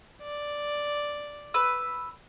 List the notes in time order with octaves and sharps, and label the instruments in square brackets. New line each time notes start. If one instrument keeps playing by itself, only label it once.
[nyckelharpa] D5
[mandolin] B4 E6